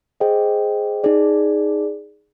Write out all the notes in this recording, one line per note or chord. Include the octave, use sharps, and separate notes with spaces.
G#4 C5 D#5 G5
D#4 G#4 D5